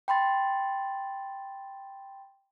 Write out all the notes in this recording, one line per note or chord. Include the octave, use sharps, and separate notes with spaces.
G5 B5 C6 A6